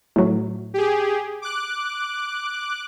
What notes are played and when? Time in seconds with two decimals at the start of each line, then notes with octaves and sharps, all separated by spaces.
0.16 A2 F#3
0.74 G4 G#4
1.42 D6 F#6